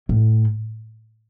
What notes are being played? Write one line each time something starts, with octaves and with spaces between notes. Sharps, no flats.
A2